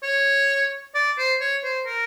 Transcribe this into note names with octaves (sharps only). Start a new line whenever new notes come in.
C#5
D5
C5
C#5
C5
A#4